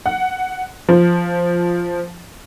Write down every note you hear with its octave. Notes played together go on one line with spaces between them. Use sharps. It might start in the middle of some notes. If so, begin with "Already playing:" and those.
F#5
F3